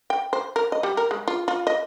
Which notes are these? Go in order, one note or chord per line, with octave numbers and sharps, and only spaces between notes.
G5
C5
A#4
D#5
G3
A#4
G#3
F4
F4
D#5